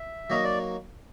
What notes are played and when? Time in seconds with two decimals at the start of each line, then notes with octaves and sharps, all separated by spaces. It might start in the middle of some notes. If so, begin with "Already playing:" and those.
Already playing: E5
0.30 F#3 A#3 D#4 F#4 A#4 D#5
0.44 D5